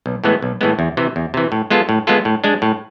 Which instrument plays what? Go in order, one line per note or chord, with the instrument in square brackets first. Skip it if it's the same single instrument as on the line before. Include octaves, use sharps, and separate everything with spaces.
[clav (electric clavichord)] B1
A2 E3 G#3 B3
B1
A2 E3 G#3 B3
E2
C3 E3
E2
C3 E3
A2
G#3 B3 F4 A4
A2
G#3 B3 F4 A4
A2
G#3 D4
A2